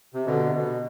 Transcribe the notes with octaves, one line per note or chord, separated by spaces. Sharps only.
C3
B2 D3
C3
B2